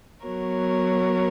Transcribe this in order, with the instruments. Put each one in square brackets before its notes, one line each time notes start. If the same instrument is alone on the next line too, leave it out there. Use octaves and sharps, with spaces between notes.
[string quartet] F#3 B3 F#4 A#4 C#5